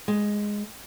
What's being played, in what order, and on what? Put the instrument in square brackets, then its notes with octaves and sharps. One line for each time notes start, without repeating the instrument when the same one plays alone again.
[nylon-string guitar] G#3